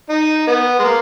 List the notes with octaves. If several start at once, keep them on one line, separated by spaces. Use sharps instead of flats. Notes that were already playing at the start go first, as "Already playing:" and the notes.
D#4
B3
G#3
A#3